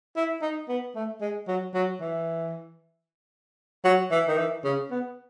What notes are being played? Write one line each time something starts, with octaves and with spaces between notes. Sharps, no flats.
E4
D#4
B3
A3
G#3
F#3
F#3
E3
F#3
E3
D#3
E3
C#3
B3